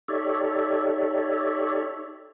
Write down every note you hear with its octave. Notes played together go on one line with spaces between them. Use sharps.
D#4 G4 A4 C#5 D5 E5